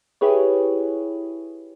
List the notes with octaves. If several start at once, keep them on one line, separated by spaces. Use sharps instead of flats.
E4 G4 G#4 B4 C#5